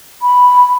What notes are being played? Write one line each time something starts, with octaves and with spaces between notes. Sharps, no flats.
B5